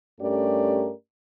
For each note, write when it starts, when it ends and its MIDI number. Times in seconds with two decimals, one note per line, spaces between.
0.21 0.91 43
0.21 0.91 57
0.21 0.91 61
0.21 0.91 67
0.21 0.91 70
0.21 0.91 74